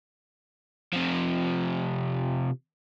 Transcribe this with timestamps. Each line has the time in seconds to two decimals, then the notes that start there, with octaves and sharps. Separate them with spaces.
0.93 C3 F3